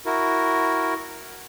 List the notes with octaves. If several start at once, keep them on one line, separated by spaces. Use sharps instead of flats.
E4 F#4 A#4